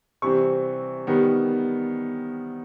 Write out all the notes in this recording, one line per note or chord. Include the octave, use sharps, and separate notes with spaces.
C3 E3 G3 C4 C#6
D#3 G3 B3